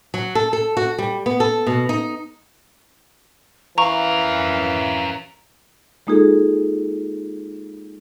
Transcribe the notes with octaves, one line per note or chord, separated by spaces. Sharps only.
F#3
A4
A4
F#4
G3
B3
A4
B2
D#4
E3 C#4 A#4 F5 A#5 C#6
G#3 A#3 D#4 F4 G#4 A4